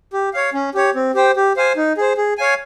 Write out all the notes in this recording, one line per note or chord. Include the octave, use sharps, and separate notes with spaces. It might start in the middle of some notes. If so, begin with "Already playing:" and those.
G4
C#5 F5
C#4
G4 C#5
C4
G4 C5 G5
G4
C5 F5 G#5
D#4
G#4 C5
G#4
C#5 F5 G#5